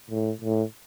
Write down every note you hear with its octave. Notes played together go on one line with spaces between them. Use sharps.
A2
A2